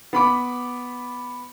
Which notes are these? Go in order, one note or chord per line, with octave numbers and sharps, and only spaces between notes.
B3 B5 D6